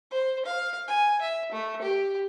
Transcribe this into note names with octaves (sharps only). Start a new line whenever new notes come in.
C5
F5
G#5
E5
A3
G4